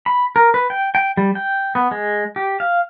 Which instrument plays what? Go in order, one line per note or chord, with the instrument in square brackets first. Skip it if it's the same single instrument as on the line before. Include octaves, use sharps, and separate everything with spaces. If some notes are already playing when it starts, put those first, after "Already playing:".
[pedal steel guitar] B5
A#4
B4
G5
G5
G3
G5
B3
G#3
G4
F5